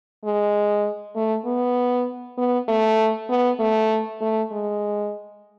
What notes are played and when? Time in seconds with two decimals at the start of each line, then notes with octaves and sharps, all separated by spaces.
0.24 G#3
1.16 A3
1.45 B3
2.38 B3
2.68 A3
3.30 B3
3.59 A3
4.21 A3
4.52 G#3